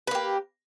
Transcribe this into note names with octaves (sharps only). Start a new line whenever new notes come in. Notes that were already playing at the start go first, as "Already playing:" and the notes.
A#3 G4 B4